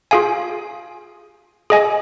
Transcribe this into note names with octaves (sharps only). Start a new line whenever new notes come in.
F4 G#4 F5 G#5
G#4 D#5 G#5